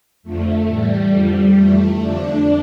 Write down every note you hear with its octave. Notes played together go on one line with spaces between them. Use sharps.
F2 D3 F3 A3
A2 E3 G3
F2 D3 F3
F2 E3 A3
F2 D3 F3 D4